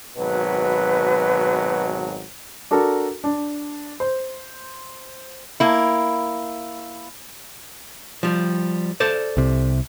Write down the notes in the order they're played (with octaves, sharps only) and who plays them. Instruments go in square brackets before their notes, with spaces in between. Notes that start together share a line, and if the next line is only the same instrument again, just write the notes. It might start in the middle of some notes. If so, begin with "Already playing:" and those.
[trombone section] G#1 B2 F#3 [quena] B4
[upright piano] D4 F#4 A4 A#4
D4
C5
[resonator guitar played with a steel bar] A#3 E4
[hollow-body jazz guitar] F3 G3
A4 C5 D5
[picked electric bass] C2 C3